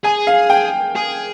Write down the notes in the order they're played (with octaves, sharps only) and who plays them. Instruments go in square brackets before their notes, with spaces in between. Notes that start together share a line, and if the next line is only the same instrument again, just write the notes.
[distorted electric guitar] G#4 [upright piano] G#5
[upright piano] F5
G5
[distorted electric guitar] G#4